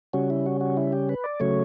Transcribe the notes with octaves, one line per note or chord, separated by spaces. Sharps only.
C#3 G3 C#4 F#4
E4
F#4
F#4
E4
G4
B4
D5
C#3 F#3 A3 C#5